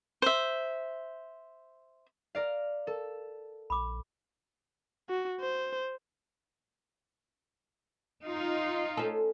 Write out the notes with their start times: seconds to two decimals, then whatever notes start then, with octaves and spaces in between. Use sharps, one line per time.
0.22 C5 E5
2.35 A#4 D5 F5
2.87 A4 A#4
3.70 A#1 B5 D6
5.09 F#4
5.40 C5
8.22 D#4 F4
8.97 C#4 A4